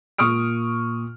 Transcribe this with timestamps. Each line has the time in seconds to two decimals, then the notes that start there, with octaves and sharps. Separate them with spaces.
0.18 A#2 C#6 D#6 F6 D7